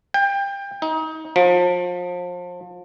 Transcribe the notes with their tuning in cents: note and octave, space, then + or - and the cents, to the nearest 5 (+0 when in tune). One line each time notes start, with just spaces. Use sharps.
G5 +25
D#4 +30
F3 +30